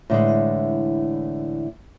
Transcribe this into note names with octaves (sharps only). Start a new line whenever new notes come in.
A2 D3 E3 G#3